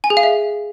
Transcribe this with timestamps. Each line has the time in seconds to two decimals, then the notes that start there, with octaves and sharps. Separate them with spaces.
0.04 G#5
0.10 G#4
0.17 F5
0.23 E5